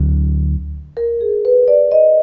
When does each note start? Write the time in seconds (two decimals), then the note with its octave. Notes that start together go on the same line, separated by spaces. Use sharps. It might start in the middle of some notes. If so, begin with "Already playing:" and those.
Already playing: D2 D3 F#3
0.97 A#4
1.21 G#4
1.45 B4
1.68 D5
1.92 D#5